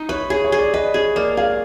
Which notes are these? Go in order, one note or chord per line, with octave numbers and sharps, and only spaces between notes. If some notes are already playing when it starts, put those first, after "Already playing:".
Already playing: D#4
B4 C#5
G#4 C#5
C#5
G#4
D5
B4 D#5
G#4 C#5
A#3 D5
G#4 F5